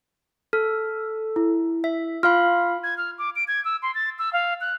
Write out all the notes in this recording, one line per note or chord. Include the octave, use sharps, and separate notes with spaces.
A4 F6
E4
E5
F4 F5 B5 F6
G#6
F6
D6
D7
G#6
E6
C6
A6
E6
F5
F#6